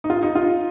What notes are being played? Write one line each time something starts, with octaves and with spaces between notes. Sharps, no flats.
D#4
F4
D#4
F4